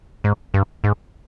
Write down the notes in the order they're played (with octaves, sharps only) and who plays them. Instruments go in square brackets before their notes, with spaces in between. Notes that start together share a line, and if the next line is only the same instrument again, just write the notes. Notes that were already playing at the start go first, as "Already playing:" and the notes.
[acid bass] G#2
G2
G#2